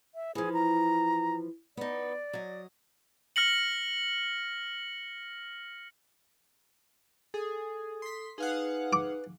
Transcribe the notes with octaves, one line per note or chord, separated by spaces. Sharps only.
E5
E3 F3 G#4
A#5
B3 D#4 D5
F#3 D#5
F6 A#6 C#7 F#7
G#4 A4 D#6
C6 B6
D#4 G#4 B4 F5 F#5
D6